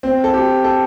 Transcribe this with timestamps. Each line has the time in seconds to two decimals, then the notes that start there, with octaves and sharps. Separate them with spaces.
0.03 C4
0.24 A4
0.34 G4
0.64 A4